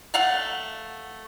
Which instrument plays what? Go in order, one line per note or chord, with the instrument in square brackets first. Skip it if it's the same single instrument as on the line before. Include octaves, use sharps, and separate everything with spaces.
[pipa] A3 F5 F#5